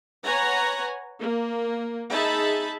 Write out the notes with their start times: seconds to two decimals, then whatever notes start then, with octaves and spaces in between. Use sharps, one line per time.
0.24 B4 C#5 F#5 G#5 A#5
1.20 A#3
2.11 D#4 G#4 E5 A5 B5